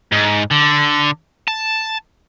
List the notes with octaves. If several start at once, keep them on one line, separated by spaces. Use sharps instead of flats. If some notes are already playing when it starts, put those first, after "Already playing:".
G#2
D3
A5